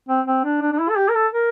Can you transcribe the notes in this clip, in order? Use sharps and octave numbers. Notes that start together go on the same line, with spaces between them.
C4
C4
D4
D4
D4
E4
A4
G4
A#4
A4
A#4